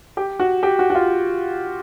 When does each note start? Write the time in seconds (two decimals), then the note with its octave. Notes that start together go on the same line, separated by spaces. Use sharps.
0.17 G4
0.40 F#4
0.63 G4
0.79 F#4
0.90 F#4
0.95 F4